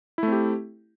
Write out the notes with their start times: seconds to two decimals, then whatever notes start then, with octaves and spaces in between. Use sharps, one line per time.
0.18 E4
0.23 A3
0.28 C4
0.32 G4